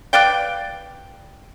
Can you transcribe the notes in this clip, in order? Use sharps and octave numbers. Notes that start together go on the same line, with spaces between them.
B4 D5 F5 G5